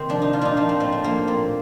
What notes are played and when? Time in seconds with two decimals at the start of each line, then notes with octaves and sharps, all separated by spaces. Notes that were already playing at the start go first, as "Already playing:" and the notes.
Already playing: C3 D#3 C4
0.09 F3 D4
0.22 D#4
0.33 A#2 F4
0.41 D4 D#4
0.57 F3 D#4
0.69 C4
0.80 A2 C4
0.92 D4
1.04 F3 A#3
1.27 A#2 C4